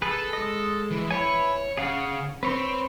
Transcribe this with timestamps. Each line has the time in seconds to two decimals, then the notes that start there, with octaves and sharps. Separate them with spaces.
0.02 G#4 A4 B4
0.33 G#3 D#5
0.91 E3
1.11 E4 B4 C#5 G#5
1.77 C#3 G#4 F5 F#5
2.43 C4 B4 C#5 C6